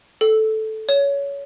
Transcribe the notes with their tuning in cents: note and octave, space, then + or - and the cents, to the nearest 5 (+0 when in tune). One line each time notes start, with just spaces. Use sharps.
A4 -10
C#5 +20